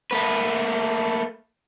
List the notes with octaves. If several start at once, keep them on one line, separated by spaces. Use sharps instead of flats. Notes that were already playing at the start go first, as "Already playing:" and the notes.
A3 A#3 B4